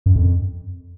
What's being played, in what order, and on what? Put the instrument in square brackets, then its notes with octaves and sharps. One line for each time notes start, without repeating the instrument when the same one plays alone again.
[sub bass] F#2
F2